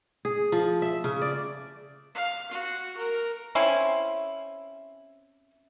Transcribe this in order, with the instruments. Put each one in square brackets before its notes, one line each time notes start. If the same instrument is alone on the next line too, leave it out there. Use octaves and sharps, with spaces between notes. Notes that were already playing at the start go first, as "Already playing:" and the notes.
[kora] G#4
F3
E5
C#3
D5
[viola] F5
F#4
A#4
[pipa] C4 C#4 E4